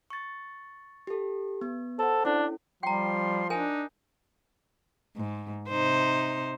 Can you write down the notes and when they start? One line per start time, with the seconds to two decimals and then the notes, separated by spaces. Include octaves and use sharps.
0.10 C#6 A6
1.07 G4 A4
1.61 B3
1.99 A4 C5 F#5
2.25 C#4 D4 E4 A4
2.83 F3 G3 G5 A#5 C6
3.50 D4 D#4 A#4 G#5
5.17 G#2
5.69 C3 D#4 C5